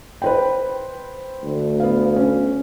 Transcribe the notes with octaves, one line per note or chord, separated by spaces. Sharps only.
B4 C5 G5
D2
B3 F5
C#4